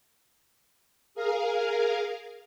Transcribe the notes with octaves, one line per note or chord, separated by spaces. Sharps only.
G#4 A#4 F5